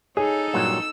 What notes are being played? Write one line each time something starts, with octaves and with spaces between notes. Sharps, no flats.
D#4 G#4 A4 C#5
G2 A#2 F#3 E6